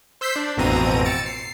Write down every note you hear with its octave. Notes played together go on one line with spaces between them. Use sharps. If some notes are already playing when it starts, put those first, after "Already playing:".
C5 E6 G6 B6 C7
D4
A1 F2 B2 C4 A#5 D#7
E6 A6 C#7 D7
C7